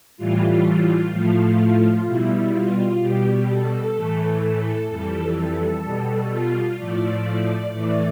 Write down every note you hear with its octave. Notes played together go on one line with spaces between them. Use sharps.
A2 E3 G3 F4
A2 F3 A3 F4
F4
B2 G3 E4
F4
B2 G3 G4
A4
A2 E3 A3
A4
F2 E3 G3 A4
B2 G3
F4
A2 F3 A3 D5
A2 E3 A3 D5